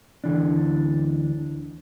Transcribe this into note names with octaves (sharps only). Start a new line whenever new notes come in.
D2 E3 D4